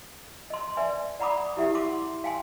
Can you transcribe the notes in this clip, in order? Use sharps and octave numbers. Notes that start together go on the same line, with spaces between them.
D#5 C6
B4 D5 E5 G#5
D5 F#5 A#5 B5 D6 D#6
E4 F#4 G4 E5 F#5
F#5 C6 D6
F5 G5 G#5 C6